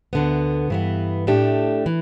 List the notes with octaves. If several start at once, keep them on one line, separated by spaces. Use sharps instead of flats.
D2 D3 B3
G2 E3 B3
A2 A3 D4 G4
E3